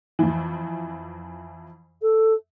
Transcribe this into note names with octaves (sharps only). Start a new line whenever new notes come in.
F2 E3
A4